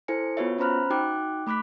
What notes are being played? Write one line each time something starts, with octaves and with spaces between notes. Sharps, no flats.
E4 A4 C5 G#5 C#7
B3 F4 F#4 B4 C#5 E5
C#4 C5 A#5 B5 F6 F#6
D#4 F#4 G5 D6 F#6
A3 B5 D6 F#6 B6